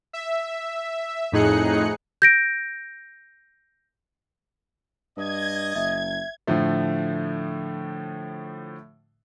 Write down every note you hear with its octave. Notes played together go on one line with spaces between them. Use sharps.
E5
F2 A2 D#4 G#4 F#6 C#7
G6 A#6 D7
G2 D#5 G#6
F#1 E5
A2 D3 F3 A3